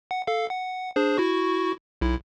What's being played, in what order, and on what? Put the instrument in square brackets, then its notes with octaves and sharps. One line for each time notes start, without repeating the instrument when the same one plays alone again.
[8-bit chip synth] F#5
A4 F5
F#5
D4 G#4 C5
E4 F#4 C#6
B1 E4